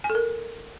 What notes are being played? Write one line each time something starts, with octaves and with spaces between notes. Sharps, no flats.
G#5
A4
A#4